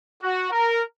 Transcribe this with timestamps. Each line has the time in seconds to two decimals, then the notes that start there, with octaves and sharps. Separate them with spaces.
0.22 F#4
0.51 A#4